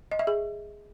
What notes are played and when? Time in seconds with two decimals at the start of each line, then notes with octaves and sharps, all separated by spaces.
0.11 D#5
0.19 E5
0.27 G#4